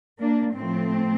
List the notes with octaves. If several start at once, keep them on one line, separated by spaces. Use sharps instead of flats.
A#3 D4
A2 F3 A3 C4